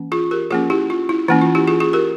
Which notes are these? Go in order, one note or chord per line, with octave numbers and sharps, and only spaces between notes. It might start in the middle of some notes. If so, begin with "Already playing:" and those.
Already playing: E3 A#3 C#4
F4 G#4
G4 A#4
F3 A#3 C#4 F4 G#4
E4 G4
F4
E4
E3 A#3 C#4 E4
F4
E4 G4
F4 G#4
F4 G#4
G4 A#4